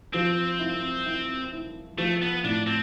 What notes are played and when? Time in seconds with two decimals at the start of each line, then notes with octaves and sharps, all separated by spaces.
0.13 F3 C4
0.60 E4
1.06 E4
1.52 E4
1.98 F3 A3
2.22 B3
2.44 A2 D4
2.67 C4